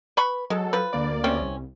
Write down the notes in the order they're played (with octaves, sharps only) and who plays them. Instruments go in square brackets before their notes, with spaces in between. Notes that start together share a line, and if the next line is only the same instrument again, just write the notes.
[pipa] B4 B5 C#6
[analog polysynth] F#3 A4 [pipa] G#3
[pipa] F3 B4
[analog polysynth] D2 A#3 D5
[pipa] C3 C4 C#4
[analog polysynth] C2